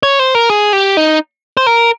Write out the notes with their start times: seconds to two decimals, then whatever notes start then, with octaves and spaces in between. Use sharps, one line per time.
0.03 C#5
0.19 C5
0.35 A#4
0.50 G#4
0.73 G4
0.97 D#4
1.57 C5
1.67 A#4